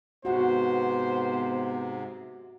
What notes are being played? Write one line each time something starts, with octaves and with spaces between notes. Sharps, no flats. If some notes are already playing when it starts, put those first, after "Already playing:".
G#2 C3 B3 F#4 C5 F#5